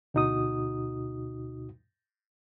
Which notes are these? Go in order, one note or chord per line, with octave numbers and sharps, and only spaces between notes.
D2 B2 D#4 F#4 D#6